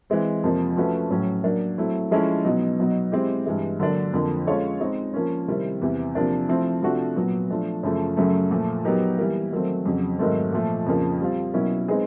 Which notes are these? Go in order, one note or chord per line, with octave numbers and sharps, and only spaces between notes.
E3 G#3 C4
F2 C3 F3 A#3
F3 A3 C#4 F#4 B4
A2 F#3 A3 C#4
F#3 A#3 D4
F#3 A3 C4 E4
F3 G#3 C#4 E4 A4
B2 F#3 B3 D#4
B2 F#3 B3 D#4
G#3 C4 E4 G4
G2 E3 G#3
D3 F#3 A#3 D4
F2 D3 F3 A#3
G#3 C#4 F4 A4 C#5
G#3 C4 D#4
F3 A#3 C#4
C3 D#3 G3 C4 E4
E2 C3 E3
C3 F3 A#3 D4
F3 A3 C4 E4
C3 F3 A3 D4 F#4
A#2 F#3 B3
F3 A3 D4
F#2 C#3 F3 A3
F#2 C#3 F#3 A3
A#2 F3 A3
F#3 B3 D#4 G4 A#4
E3 G3 A#3
D#3 F#3 A3 C4
F2 C#3 F#3
G#2 D#3 F#3 A3 C4
A#2 F3 A3
F2 C#3 F3 A#3
G3 C4 F4
B2 F#3 A#3 C#4 E4
G#3 C4 D#4 G#4 B4